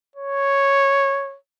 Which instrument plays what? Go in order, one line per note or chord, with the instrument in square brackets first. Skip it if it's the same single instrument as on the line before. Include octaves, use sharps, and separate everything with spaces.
[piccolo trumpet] C#5